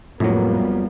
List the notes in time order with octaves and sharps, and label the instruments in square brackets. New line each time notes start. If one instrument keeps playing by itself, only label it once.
[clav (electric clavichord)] F2 F#3 [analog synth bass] A2 [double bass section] G3 A#3 B3